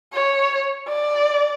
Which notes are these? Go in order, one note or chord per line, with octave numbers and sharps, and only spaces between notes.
C#5
D5